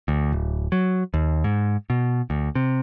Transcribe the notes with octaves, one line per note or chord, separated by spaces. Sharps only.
D2
D1
F#3
D#2
G#2
B2
D2
C3